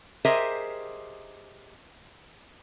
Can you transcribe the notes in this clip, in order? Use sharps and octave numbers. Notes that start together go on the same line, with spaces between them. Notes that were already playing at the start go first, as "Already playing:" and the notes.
G4 G#4 A#4 C5 D#5 E5